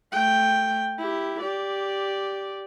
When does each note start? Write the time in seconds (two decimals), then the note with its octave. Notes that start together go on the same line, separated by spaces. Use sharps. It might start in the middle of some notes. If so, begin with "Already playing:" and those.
0.12 A3 G5
0.99 E4 G4
1.40 G4 D5